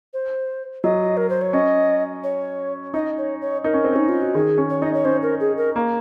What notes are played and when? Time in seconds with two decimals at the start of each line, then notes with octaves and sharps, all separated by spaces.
0.13 C5
0.84 F#3 D#5
1.17 A#4
1.29 C5
1.41 C#5
1.53 C#4 D#5
2.24 C#5
2.94 D#4 D#5
3.18 C#5
3.41 C#5
3.64 D#4 A#4
3.73 C#4
3.84 C4
3.93 C#4 D#4
4.09 F4
4.21 F#4
4.35 D#3 G#4
4.58 C#4
4.70 C#5
4.82 D#4 D#5
4.94 C#5
5.05 C#4 C5
5.22 A#4
5.40 G#4
5.57 A#4
5.76 A#3